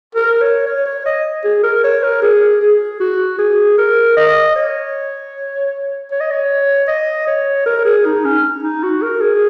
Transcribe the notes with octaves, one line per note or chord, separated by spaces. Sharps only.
A#4
C#5
C#5
C#5
D#5
G#4
A#4
C#5
A#4
G#4
G#4
F#4
G#4
A#4
D#5
C#5
C#5
D#5
C#5
D#5
C#5
A#4
G#4
D#4
C#4
D#4
F#4
A#4
G#4